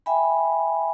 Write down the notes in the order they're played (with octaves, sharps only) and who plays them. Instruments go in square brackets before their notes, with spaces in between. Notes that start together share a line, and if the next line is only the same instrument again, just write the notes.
[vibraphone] E5 G5 G#5 B5